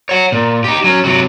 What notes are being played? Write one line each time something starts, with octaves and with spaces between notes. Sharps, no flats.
C#5 F#5
A#2
D#4 G4
F#3 C#4
C3 F#3